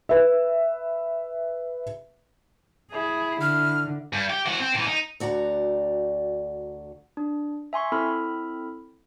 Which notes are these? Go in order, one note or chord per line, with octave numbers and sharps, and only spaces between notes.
B4 E5
E4 G#4
D3 F6
G2
G4
E3 F#4
C4
A#2 E3
D#4
D2 F#4 D5 A#5
D4
E5 G#5 C6 C#6
C4 E4 A4 B5 F6